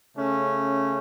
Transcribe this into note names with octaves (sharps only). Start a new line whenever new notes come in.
C#3 A3 C#4